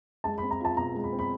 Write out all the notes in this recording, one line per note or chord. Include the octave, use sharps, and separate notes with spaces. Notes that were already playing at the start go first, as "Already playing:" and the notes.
G#3 A5
B5
C4
A#5
F4 A5
B2 A#5
G#3
B5
C4
B5